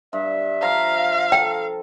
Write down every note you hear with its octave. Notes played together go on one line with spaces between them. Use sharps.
G2 E5
F3 F5 A#5
A4 G5